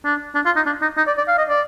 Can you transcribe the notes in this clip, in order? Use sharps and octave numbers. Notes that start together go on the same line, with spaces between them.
D4
D4
F4
D#4
D4
D#4
D#4
D5
D5
F5
D#5
D5